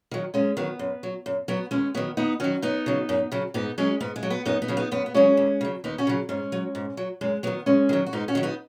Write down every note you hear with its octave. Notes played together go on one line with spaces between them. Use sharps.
D#3 F#3
F#2 G#3 C#4
D#3 F#3 B3
F#2
F#3
F#2
F#3 B3
D#2 G#3 C#4
D#3 F#3 B3
D#2 B3 D#4
D#3 F#3 C#4 F#4
F#2 B3 D#4
C#3 F#3
F#2
C#3 F#3
G#2 B3 D#4
F#3 G#3 C#4
G#2 B3
G#3
F#3
B3
F#2 B3 D#4
B3 D#4
C#3 F#3
B3 D#4
F#2 B3
B3
C#3 F#3 G#3 C#4
D#2
C#3 F#3
D#2 B3 D#4
C#4 F#4
C#3 F#3
G#2 G#3 C#4
F#3
G#2
F#3
F#2 G#3
D#3 F#3 B3
F#2 G#3 C#4
D#3 F#3
F#4
G#2 B3 D#4
C#4 F#4
D#3 F#3
B3 D#4